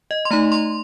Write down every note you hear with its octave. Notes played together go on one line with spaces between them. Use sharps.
D#5
C6
A3 D#4 A#5
C6